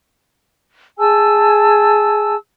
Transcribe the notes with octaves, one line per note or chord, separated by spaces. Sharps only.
G#4 G#5 A5 E6